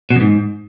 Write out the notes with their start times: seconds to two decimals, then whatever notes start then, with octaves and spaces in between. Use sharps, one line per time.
0.10 B2
0.16 F2
0.21 G#2